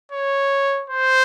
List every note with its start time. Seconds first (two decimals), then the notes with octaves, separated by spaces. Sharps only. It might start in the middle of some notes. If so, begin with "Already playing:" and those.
0.12 C#5
0.90 C5